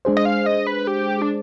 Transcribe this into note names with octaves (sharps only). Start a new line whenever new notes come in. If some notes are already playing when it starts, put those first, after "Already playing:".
G#3 D4 G#4 C5
D#5
F5
D#5
B4
G4
D4